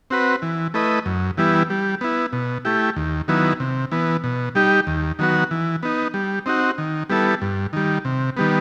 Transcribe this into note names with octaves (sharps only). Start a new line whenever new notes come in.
C4 F#4 B4
E3
A3 E4 B4 D#5
F#2
E3 G3 B3 E4
G3
B3 E4
B2
A3 E4 G4
D#2
D#3 F#3 B3 E4
C3
E3 B3
B2
G3 D#4 G4
D#2
D#3 F#3 B3 F#4
E3
B3 D#4
G3
C4 D#4 F#4
D#3
G3 B3 E4 A4
G2
D#3 G3
C3
D#3 G3 B3